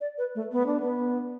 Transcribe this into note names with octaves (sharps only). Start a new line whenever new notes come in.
D5
B4
A3
B3
D4
B3